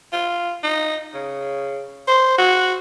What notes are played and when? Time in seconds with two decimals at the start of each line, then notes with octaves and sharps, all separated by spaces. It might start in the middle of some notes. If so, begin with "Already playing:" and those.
0.12 F4
0.63 D#4
1.14 C#3
2.08 C5
2.38 F#4